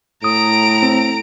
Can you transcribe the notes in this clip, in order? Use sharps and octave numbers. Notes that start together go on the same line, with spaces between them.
A2 A#5 D#6 D7
C4